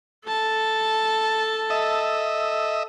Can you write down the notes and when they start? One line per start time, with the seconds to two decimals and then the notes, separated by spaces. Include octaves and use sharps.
0.28 A4 A5
1.70 D#5 E5